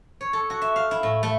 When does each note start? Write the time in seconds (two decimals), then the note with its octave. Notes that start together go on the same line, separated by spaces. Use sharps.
0.21 C#5
0.33 A4
0.50 F#4
0.62 E5
0.76 F5
0.91 E4
1.03 A2
1.23 A3